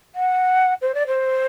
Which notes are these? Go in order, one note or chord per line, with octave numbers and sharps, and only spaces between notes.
F#5
C5
D5
C5